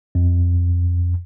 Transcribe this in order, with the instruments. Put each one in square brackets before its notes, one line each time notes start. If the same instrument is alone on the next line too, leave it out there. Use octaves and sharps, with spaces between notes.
[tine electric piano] F2